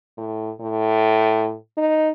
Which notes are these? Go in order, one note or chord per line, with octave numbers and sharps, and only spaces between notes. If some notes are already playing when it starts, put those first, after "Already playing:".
A2
A2
D#4